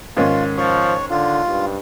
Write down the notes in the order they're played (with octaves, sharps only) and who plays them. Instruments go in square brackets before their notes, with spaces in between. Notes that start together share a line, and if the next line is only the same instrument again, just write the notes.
[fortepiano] G#2 D#3 C#4 [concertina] F4
[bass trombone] F3 [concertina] C#5
[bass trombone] D3 [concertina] F4
[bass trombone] G2